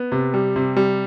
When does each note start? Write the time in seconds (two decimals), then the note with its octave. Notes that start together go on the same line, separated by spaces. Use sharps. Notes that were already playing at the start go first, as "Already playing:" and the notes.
Already playing: B3
0.12 C3
0.34 G3
0.56 C3
0.77 G3